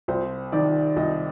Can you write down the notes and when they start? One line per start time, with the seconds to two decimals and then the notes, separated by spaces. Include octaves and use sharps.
0.08 C2 C5
0.52 D#3 D5
0.96 C2 D#5